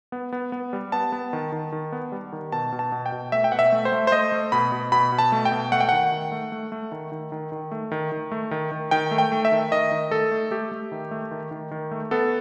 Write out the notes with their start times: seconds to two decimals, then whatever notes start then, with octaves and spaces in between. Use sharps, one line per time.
0.12 B3
0.33 B3
0.52 B3
0.73 G3
0.92 B3 A5
1.12 B3
1.33 D#3
1.52 D#3
1.72 D#3
1.92 B3
2.12 G3
2.33 D#3
2.52 B2 A5
2.72 B2
2.79 A5
2.92 B2
3.06 G5
3.12 B2
3.32 A3 E5
3.44 G5
3.52 B2 F#5
3.59 E5
3.72 A3
3.85 C5
3.92 A3
4.07 C5
4.12 A3 D#5
4.32 A3
4.52 B2 B5
4.72 B2
4.92 B2 B5
5.12 B2
5.19 A5
5.32 A3
5.45 G5
5.52 B2
5.72 A3 F#5
5.81 G5
5.89 D#3 F#5
6.12 D#3
6.32 A3
6.52 A3
6.72 A3
6.92 D#3
7.12 D#3
7.32 D#3
7.52 D#3
7.72 A3
7.92 D#3
8.12 D#3
8.32 A3
8.51 D#3
8.72 D#3
8.91 D#3 G5
9.11 A3
9.18 G5
9.32 A3
9.45 E5
9.52 D#3
9.71 D#3 D#5
9.92 D#3
10.11 A3 A4
10.31 A3
10.51 A3 G4
10.72 A3
10.92 D#3
11.11 A3
11.31 D#3
11.51 D#3
11.71 D#3
11.91 A3
12.11 B3 A4